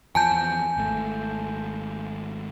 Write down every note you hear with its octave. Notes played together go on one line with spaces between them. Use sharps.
E2 F3 G#5 A5 G6
G#1 A3